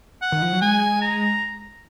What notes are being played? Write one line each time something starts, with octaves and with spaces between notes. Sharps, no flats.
F#5
D#3
F3
F#3
G#3 G#5
A#5